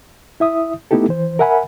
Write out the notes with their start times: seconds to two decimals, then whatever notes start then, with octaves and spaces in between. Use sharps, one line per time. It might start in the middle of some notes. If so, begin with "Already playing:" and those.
0.40 E4 E5 D#6
0.91 A3 B3 D#4 E4 G4 A4
1.08 E3 C5
1.39 A#4 E5 F#5 G#5 B5